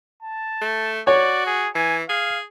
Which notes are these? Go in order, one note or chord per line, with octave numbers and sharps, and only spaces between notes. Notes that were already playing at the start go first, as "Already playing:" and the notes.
A5
A3
F#4 C#5 D5
G#4
E3 G#5
G#4 F5